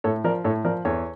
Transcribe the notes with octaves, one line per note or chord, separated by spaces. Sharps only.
A2 A4 C#5
F3 A#4 D5
A2 A4 C#5
F3 A#4 D5
E2 A4 C#5